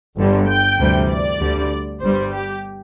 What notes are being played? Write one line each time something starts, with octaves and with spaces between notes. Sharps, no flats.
G1 G2 D3 G3
G5
D2 C3 E3 G3
D5
D2 D3 G3
G1 G2 G3 C5
G4